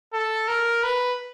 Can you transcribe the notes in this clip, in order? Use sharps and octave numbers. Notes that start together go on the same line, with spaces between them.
A4
A#4
B4